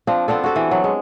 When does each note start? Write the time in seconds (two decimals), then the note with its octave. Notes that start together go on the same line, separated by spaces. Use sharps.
0.07 F3 C4 D4
0.28 B3 C4 D4 A4
0.44 F#4 G4 A4
0.56 E3
0.71 F#3
0.84 G#3